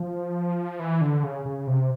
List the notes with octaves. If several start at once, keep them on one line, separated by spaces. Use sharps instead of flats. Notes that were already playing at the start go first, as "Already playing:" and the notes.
Already playing: F3
E3
D3
C#3
C#3
C3